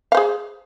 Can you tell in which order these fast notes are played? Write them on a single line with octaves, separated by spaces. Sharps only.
F5 C5 G#4